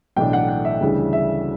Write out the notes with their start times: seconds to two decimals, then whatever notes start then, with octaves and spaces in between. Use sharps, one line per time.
0.16 B1 A2 E3 A3 D4 G5
0.33 F#5
0.49 F#5
0.65 E5
0.81 D2 C#3 E3 G3 D4
1.13 E5